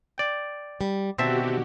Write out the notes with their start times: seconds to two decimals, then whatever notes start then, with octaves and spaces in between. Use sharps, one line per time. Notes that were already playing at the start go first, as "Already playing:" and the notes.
0.18 D5 G5
0.81 G3
1.18 B2 D3 D#3 C4 F#4 G4 E5 A5